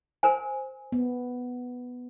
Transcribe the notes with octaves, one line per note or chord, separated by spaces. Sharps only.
A#4 C5 G#5
B3